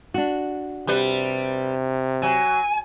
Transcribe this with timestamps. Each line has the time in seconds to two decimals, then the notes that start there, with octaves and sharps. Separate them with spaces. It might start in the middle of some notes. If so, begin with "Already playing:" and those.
0.14 D4 F#4
0.87 C3 G3 B4
2.23 F#3 G#5